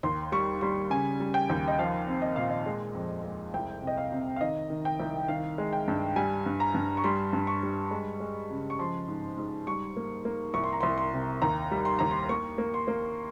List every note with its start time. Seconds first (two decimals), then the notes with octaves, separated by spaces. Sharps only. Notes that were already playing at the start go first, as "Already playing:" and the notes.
0.03 D#2 C6
0.32 G3 C#6
0.61 G3 C6
0.90 C#3 G#5
1.20 G3
1.34 G5
1.50 D#2
1.68 D#5
1.78 F3 F5
2.07 C4
2.22 D#5
2.36 A#2 F5
2.50 D#5
2.66 G#3
2.95 F2
3.24 G#3
3.54 C2 G5
3.82 C3 D#5
3.98 F5
4.12 C3
4.36 F5
4.41 D#3 D#5
4.70 D#3
4.85 G5
5.00 C2
5.28 D#3 F5
5.58 G#3
5.73 G5
5.88 G2
6.16 G3 G#5
6.46 G2
6.60 A#5
6.75 G2
6.97 C#6
7.04 G3 C6
7.33 G2
7.47 C#6
7.63 G3
7.91 G#3
8.20 G#3
8.50 C#3
8.70 C#6
8.79 F3 C6
9.08 G#2
9.37 G#2
9.67 G3 C#6
9.97 A#3
10.25 A#3
10.54 C2 C#6
10.64 C6
10.73 A#5
10.81 C2 C6
10.98 C6
11.13 C3
11.42 D#2 A#5
11.71 G3
11.85 C6
11.99 D#2 A#5
12.11 C6
12.29 A#3 C#6
12.58 A#3
12.74 C6
12.88 A#3